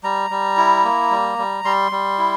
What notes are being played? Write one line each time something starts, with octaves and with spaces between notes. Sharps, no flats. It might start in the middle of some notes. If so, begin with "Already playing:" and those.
G3 A#5
G3
E4
A#3
G3
G3
G3 C6
G3
E4